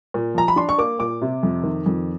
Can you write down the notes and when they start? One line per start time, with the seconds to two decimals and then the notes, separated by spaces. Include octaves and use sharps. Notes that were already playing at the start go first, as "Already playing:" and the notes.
0.14 A#2
0.35 F3 A#5
0.48 B5
0.56 D4 C6
0.69 C#6
0.78 A#3 D6
0.99 A#2 D6
1.22 C3
1.43 F2
1.63 D#3
1.86 F2